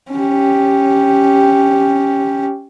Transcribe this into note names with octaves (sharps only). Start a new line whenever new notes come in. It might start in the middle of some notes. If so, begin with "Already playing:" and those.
C#4 G4